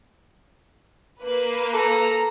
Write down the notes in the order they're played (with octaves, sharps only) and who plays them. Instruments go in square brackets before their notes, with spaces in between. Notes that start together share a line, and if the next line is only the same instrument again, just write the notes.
[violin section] A#3 B4
[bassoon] A4 [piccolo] A#5